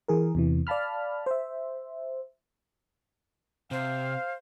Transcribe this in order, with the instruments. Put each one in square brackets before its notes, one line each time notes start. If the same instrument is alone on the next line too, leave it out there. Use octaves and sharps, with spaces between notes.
[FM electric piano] E3 G#4 A#4
E2 C3 E3
D5 F5 A5 B5 F6
C5 E5
[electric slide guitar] C3 [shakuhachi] C5 [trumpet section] F5